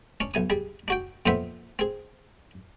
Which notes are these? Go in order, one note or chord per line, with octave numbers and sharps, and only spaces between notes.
C#4 D4
B1 G#5 D#6
G3 G#4
D4 F#4 G5
F2 A#2 B3 C4 C5 E5
C4 G#4